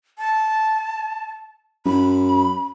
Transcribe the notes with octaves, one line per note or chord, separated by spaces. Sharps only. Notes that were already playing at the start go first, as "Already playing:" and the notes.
A5
F#2 B5